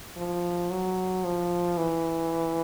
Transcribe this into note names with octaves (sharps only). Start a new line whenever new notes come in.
F3
F#3
F3
E3